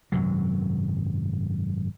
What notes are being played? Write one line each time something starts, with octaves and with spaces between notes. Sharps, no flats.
G#1 F#2 C3 F#3